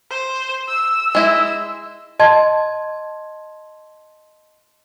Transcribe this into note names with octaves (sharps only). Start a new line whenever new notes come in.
C5
E6
G#3 E4 D#5
D#5 A5 C6 G#6